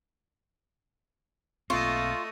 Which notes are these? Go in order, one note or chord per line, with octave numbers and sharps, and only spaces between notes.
B1 A3 A#3 C4 F4 D#5 C#6